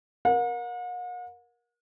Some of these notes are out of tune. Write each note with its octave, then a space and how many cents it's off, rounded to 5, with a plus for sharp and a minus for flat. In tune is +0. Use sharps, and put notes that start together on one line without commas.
A#4 +20 F#5 -45